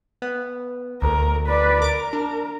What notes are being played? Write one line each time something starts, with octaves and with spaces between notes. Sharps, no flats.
B3
D2 A#4
B4 D5
A#4 D6 D7
D4